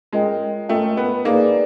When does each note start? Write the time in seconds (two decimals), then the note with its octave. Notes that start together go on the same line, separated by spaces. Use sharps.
0.13 G#3 C#4 F4 A#4 D#5 G5
0.69 A3 C#4 F4 A#4 D#5 G5
0.97 B3
1.25 A#3 D#4 G#4 B4 D5